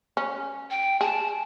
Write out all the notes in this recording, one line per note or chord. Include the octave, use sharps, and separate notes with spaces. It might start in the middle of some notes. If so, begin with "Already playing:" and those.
C#4
G5
G#4 A5